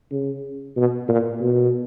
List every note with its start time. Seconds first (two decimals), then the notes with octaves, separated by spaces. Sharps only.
0.11 C#3
0.76 B2
1.08 A#2
1.41 B2